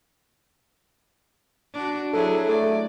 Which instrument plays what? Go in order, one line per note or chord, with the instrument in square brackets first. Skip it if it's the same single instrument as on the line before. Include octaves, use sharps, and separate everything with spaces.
[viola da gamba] D4 F#4
[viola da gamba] F#3 E4 G#4 [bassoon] A4
[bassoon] A3 [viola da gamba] D5